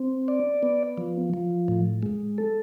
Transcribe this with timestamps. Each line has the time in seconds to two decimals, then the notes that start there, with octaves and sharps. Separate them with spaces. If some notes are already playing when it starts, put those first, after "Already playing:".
Already playing: C4
0.28 D5
0.63 B3
0.98 F3
1.33 F3
1.68 A2
2.03 G#3
2.38 A4